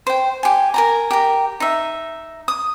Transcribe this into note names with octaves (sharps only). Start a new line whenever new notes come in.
C5 G5
G4 G#5
A#4 G#5 A#5
G4 A#4
D#4 E5
D#6